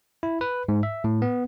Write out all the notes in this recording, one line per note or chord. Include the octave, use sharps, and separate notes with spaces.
E4
B4
G#2
E5
A2
B3